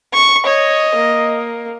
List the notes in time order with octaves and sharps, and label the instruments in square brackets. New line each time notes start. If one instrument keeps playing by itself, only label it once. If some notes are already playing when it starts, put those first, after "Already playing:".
[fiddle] C#6
[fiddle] C#5 [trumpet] D#5
[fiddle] A#3